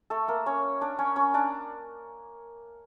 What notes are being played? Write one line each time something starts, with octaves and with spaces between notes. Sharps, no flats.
A3 A4
A#3 A#4
C#4 C#5
D4 D5
C#4 C#5
C#4 C#5
D4 D5